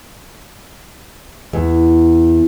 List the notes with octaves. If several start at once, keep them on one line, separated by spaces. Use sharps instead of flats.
E2